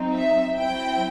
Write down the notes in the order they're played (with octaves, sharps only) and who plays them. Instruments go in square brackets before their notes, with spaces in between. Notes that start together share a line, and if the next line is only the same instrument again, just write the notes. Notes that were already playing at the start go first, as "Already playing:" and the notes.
Already playing: [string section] F#3 C4 D#4
E5
F#3 C4 E4 G5